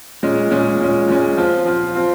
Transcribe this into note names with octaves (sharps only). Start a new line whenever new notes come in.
A#2 G#3 C#4
A#2 G#3 C#4
A#2 G#3 C#4
A#2 G#3 C#4
F3 C4 F4
F3 C4 F4
F3 C4 F4